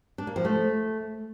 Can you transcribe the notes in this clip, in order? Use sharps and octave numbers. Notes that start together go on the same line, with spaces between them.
D4
A#3
F3
A3